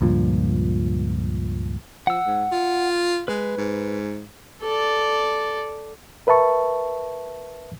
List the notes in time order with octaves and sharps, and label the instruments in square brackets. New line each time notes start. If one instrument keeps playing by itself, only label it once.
[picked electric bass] C#2 G2 A#2 F3
[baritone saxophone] F3 [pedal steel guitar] F#5 E6
[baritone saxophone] G#2
F4
[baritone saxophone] G#3 [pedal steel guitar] B4
[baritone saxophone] G#2
[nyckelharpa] A4 D5
[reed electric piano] A#4 B4 E5 A5 C#6